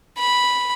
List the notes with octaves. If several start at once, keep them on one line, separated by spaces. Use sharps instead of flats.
B5